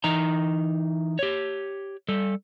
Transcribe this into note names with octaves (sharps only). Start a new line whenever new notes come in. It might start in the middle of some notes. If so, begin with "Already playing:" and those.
E3 D#4 A#5
G4 C#5
G3 A4